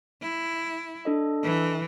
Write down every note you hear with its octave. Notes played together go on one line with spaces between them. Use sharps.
E4
D4 A4 D#5
E3